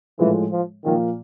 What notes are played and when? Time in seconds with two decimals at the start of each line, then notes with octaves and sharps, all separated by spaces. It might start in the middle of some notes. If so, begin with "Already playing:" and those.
0.19 A2 E3 F3 G#3
0.52 F3
0.85 A#2 D#3 F3 A#3